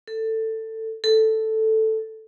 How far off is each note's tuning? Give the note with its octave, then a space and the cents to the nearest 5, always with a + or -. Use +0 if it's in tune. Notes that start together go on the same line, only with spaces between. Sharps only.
A4 +15
A4 +0